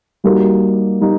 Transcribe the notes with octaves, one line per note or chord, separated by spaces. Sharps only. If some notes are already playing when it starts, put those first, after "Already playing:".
G3 A#3 D#4 F#4 A#4
G3 A#3 D#4